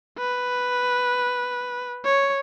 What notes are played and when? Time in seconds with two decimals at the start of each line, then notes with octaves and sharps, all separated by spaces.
0.18 B4
2.05 C#5